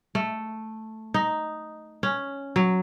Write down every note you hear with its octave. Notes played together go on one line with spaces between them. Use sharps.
A3
D#4
C#4
F#3